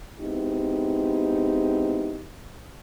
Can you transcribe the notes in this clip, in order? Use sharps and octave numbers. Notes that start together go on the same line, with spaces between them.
G#3 B3 C4 D#4 E4 G4